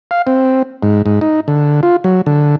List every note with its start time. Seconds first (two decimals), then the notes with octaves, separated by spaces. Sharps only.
0.11 F5
0.27 C4
0.83 G#2
1.06 G#2
1.21 D#4
1.48 D3
1.83 F4
2.04 F#3
2.26 D3